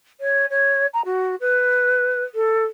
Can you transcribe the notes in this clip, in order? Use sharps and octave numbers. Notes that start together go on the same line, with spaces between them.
C#5
C#5
A#5
F#4
B4
A4